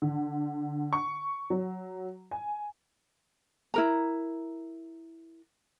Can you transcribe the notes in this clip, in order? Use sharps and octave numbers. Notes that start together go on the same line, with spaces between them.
D3
C#6
F#3
G#5
E4 A#4 A#5